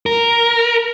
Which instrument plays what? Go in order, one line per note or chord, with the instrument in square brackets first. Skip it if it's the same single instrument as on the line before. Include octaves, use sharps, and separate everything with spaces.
[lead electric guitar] A#4